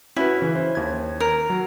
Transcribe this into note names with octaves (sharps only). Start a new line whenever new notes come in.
C#4 E4 F#4 B4
C#3 E3
C#4 C5
D#2 G#6
A#4
F#3